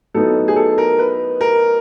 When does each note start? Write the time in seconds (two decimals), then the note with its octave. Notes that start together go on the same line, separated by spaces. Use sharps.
0.14 A2 F#3 B3 D#4 A4
0.48 G#4
0.56 A4
0.78 A#4
0.99 B4
1.41 A#4